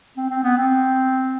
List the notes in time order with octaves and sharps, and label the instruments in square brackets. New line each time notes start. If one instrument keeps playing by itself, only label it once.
[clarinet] C4
C4
B3
C4